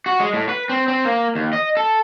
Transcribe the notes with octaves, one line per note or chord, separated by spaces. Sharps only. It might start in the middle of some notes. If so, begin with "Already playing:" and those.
F#4
G#3
A2
B4
C4
C4
A#3
D#2
D#5
A4